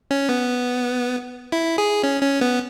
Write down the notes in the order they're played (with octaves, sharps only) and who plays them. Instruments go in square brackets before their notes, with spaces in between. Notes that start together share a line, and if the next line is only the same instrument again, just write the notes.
[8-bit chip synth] C#4
B3
E4
G#4
C#4
C#4
B3